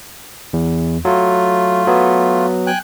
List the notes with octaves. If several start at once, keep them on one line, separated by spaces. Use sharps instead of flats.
E2
F#3 A3 F4
F#3 B3
G5 G#5 F#6